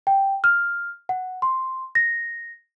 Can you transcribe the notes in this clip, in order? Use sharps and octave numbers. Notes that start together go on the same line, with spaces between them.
G5
F6
F#5
C6
A#6